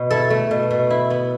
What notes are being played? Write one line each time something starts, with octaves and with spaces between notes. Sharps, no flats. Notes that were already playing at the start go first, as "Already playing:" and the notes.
Already playing: B2
E4 A4
A3
B2
B2
E4
B3